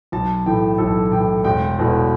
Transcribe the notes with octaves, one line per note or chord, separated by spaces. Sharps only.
B1 A5
A2 E3 A3 G5
B1 A4
A2 E3 A3 G5
E1 G5
E2 B2 A3